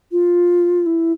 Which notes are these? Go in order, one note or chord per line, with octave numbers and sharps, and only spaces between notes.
F4
E4